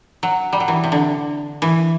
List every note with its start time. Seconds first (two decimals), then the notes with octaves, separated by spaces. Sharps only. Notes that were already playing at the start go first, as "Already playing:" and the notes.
0.23 F#3
0.53 G3
0.60 F#3
0.68 E3
0.84 C3
0.92 D3
1.62 E3